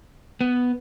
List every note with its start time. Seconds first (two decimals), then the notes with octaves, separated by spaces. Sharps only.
0.41 B3